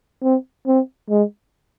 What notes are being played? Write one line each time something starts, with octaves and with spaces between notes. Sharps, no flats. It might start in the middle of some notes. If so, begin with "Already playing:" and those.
C4
C4
G#3